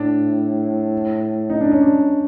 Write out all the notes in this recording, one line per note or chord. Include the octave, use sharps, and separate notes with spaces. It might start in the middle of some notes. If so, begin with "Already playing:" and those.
Already playing: A2 D4
D#4
D4
C#4
D4